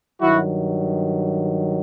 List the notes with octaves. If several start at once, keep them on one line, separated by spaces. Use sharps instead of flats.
G2 D#3 F#3 E4 F#4